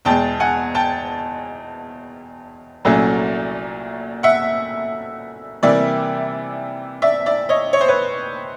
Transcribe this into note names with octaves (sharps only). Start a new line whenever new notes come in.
E2 B2 G#3 G5 A5
F#5 G#5
G5 A5
C2 A#2 F#3 A3 C#4
E5 F#5
C3 E3 G3 A#3 D5 E5
D5 E5
D5 E5
C#5 D#5
C#5
C5
B4 C#5